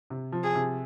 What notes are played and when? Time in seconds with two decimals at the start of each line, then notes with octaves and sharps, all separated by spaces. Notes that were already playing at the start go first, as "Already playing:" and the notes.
0.10 C3
0.32 F3
0.44 G#4
0.55 C3